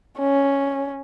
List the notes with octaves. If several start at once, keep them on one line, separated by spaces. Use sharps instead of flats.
C#4